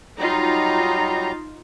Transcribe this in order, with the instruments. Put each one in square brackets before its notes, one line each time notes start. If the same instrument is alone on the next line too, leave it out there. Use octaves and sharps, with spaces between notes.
[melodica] F#3 G3 A#5 [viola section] D#4 F4